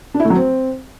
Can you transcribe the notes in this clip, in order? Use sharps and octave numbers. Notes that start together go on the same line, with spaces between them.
D4
E4
A3
F#3
C4